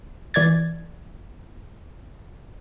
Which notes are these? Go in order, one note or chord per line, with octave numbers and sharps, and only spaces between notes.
E3 D5 G#6 A6